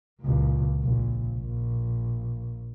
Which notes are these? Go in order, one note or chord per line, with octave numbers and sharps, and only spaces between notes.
C#2 A#2
A#1
A#1